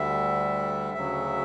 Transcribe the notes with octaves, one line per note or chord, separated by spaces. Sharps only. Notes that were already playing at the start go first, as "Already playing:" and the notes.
Already playing: D2 D3 G3 E5
D2 C#3 F#3 E5